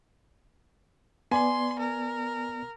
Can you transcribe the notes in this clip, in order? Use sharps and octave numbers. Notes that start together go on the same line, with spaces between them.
B3 D5 G#5 C6
A#4